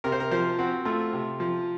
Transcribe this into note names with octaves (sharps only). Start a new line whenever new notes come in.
C3 A#4
C5
A#4
F3 C5
C4 F#4
A3 F4
C3
F3